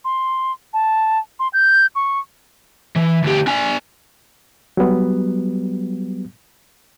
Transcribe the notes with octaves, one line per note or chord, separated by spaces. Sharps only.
C6
A5
C6
G6
C#6
E3
D2 G4
D4 G#5
F#3 G3 B3